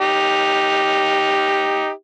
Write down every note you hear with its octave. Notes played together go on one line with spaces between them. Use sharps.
D#4 G4